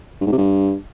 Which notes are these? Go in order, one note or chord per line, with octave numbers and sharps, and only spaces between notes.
G2
G#2
C3
G2